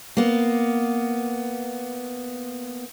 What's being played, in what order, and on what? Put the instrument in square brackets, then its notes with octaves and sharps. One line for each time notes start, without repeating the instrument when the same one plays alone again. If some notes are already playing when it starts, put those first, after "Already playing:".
[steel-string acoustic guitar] A#3 B3